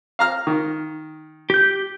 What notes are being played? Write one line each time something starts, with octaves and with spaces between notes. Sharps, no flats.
F5 A#5 F6
D#3
G4 G6